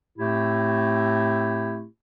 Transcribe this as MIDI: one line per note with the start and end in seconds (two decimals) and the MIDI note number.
0.19 1.85 45
0.19 1.85 57
0.19 1.85 60
0.19 1.85 64
0.19 1.85 67